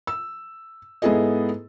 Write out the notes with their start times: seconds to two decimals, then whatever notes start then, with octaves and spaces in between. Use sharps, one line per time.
0.07 E6
1.02 G#2 B3 E4 G#4 A4 D#5